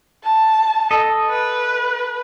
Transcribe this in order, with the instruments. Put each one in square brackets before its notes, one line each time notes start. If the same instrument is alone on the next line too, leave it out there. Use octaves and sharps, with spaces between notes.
[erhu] A5
[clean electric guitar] A4 D#5
[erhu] B4